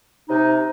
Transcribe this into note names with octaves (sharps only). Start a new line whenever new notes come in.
C3 D#4